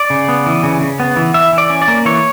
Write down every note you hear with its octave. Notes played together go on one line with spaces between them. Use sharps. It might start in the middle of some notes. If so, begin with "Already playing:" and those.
Already playing: D5
C#3
B3
E3
C#3
C#3
B3
E3
E3 E5
E3
D5
C#4
D5
A#3
E3 C#5